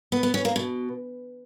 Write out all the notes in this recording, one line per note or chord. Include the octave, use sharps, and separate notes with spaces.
B3
B3
C#4
A#3
B2